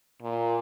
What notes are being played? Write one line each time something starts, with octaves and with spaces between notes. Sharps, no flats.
A#2